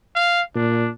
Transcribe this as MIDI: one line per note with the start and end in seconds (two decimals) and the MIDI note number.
0.15 0.42 77
0.55 0.88 46
0.55 0.88 62